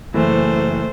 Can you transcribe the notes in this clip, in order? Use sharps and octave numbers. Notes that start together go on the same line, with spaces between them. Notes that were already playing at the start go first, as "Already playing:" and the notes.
F#1 E3 A3 C5